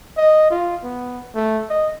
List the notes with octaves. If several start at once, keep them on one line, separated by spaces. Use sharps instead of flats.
D#5
F4
B3
A3
D#5